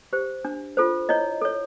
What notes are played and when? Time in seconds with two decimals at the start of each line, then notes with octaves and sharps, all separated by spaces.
0.13 G4 C5
0.45 D4
0.77 F4 A4 C5
1.09 E4 C#5 D#5
1.41 A4 C#5